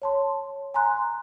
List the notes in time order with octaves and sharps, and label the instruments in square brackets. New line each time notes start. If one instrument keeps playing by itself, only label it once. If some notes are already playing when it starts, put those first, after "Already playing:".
[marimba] C#5 A5 C6
G#5 A#5 C6 F#6